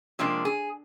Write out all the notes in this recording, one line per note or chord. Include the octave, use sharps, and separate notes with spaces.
C3 F3 G#3 A#3 D4
G#4